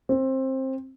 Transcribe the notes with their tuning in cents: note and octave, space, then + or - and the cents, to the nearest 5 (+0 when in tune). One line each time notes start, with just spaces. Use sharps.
C4 +20